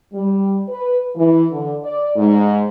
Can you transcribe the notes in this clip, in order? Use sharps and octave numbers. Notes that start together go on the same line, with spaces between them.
G3
B4
E3
D3
D5
G#2